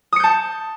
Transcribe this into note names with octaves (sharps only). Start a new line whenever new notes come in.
A5 D#6 G6 C#7